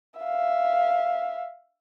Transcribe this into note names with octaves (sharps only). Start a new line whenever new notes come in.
E5 F5